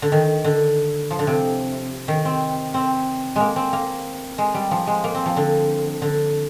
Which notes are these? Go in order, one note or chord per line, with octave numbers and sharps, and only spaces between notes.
D3
D#3
D3
F3
D3
C3
D#3
C4
C4
G#3 A#3
C4
A#3
G#3
G3
F3
G#3
A#3
C4
F3
D3
D3